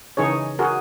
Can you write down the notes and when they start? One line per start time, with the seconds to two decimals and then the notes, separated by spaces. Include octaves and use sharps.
0.17 C#3 E3 D#4 G#4 C#5
0.59 F#4 G#4 A#4